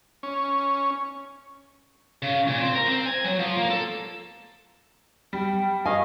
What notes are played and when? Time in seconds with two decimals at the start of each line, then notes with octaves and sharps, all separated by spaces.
0.23 C#4
2.22 C#3
2.48 A#2
2.61 C4
2.75 A#4
2.87 C4
3.06 G#5
3.24 F#3
3.39 F3
3.56 A#3
3.70 A4
5.33 G3 G5
5.86 D#5 F5 G#5 C#6